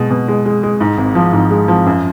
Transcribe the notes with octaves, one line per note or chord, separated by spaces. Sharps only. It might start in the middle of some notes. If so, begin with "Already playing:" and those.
Already playing: B2 G#3
B2
G#3
G#3
G#3
G#2
G#1
F3
G#2
G#3
F3
F#2